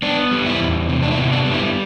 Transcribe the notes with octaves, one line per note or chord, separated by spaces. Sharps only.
B3 D4
G3
E4
E2
C3
D4
E4
B3
D4
G3
E4